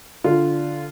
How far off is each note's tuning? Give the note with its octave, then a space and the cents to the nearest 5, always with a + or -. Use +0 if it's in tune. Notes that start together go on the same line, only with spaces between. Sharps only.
D3 -10 F4 -10